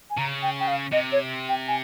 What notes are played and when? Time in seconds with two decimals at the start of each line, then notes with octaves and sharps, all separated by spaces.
0.10 G#5
0.18 C#3 A#5
0.43 G5
0.60 G5
0.68 F5
0.92 C3 D#5
1.12 C#5
1.49 G5
1.68 G#5